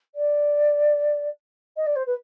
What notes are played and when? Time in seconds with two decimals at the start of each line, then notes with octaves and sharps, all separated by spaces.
0.15 D5
1.76 D#5
1.86 D5
1.95 C5
2.06 B4